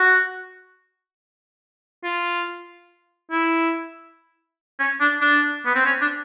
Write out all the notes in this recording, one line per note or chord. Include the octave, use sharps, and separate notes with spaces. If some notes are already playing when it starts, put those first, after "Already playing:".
Already playing: F#4
F4
E4
C#4
D4
D4
B3
C4
C#4
D4